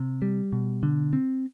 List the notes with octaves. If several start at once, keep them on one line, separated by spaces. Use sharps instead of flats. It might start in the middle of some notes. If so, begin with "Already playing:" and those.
Already playing: C3
G3
B2
D3
C4